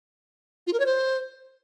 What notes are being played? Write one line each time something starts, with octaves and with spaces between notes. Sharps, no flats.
F4
A#4
C#5
C5